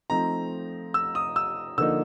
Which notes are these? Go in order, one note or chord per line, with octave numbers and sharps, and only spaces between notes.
F3 A3 C4 D#4 A#5
E6
D#6
E6
D3 F3 A#3 D#4 E6